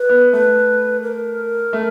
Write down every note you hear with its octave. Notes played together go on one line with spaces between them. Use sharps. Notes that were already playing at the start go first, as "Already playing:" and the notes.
Already playing: B4
B3
A3 B4
A#4
A3